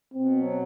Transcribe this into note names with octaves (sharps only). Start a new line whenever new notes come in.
B2 C4
F#3